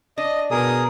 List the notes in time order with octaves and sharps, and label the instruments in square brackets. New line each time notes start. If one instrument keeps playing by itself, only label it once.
[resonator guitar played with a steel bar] D4 [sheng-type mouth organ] D#5
[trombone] B2 [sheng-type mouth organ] G#4 A#4 D#6